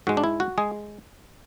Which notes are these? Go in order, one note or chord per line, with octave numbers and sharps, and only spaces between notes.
G#2 G#3 F#4
D4
E4
F#4
G#3 G#4